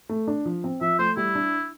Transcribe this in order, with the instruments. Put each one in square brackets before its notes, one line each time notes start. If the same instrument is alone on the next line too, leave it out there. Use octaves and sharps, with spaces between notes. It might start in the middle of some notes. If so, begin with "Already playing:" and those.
[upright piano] A3
D4
F3
C4
[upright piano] F3 [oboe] E5
[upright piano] A3 [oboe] C5
[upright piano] G3 [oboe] E4
[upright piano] D4